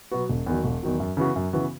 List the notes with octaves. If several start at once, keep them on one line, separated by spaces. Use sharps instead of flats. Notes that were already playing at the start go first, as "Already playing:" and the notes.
B2 F#3 B3 F#4
E1
E2 D#3 F#3
E1
E2 D#3 F#3
F#2
C#3 E3 B3 F#4
F#2
C#3 E3 B3 F#4